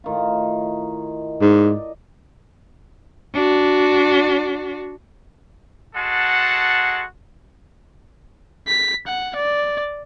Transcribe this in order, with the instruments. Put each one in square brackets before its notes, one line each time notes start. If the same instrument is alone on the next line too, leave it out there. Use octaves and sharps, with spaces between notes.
[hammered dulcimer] A2 D#3 F4
[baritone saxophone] G#2 [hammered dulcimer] D5 D#5
[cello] D4 F#4
[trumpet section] G#3 F#4 A4 F#5 A5 C6
[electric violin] B6
F#5
D5